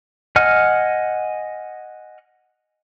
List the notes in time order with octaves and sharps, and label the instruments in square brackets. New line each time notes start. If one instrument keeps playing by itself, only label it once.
[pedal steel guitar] D#5 F#5 G#5 F6